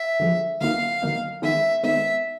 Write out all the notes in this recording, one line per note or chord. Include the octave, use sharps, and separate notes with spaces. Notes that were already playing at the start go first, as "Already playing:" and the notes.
Already playing: E5
D3 F3 G#3
D3 F#3 A#3 D#4 F5
D3 F#3 A#3 D#4
D#3 G#3 B3 D#4 E5
D#3 G#3 B3 D#4 E5